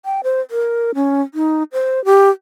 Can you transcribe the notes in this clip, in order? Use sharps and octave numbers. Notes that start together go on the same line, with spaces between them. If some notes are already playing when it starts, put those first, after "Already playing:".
G5
C5
A#4
C#4
D#4
C5
G4